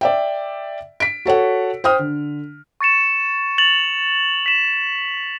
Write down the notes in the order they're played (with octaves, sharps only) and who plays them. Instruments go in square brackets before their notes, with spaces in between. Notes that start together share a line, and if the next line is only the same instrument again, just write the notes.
[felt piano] D5 E5 G5
B6 D7
F#4 A4 C#5 F#5
C5 G5 D#6 F6
D3
[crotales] C#6 A6 C#7 E7
A6 F7 F#7
B6 E7